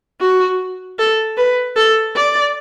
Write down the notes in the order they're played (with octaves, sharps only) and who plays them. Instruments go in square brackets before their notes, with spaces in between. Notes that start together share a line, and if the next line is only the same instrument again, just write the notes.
[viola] F#4
A4
B4
A4
D5